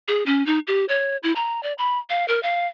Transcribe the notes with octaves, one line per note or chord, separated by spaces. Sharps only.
G#4
C#4
D#4
G4
C#5
E4
A#5
D5
B5
F5
A#4
F5